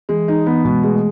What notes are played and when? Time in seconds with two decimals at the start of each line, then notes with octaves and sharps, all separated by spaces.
0.09 E3 G#3
0.28 E3 D#4
0.46 E3 B3
0.65 B2 G#3
0.83 G#3 A3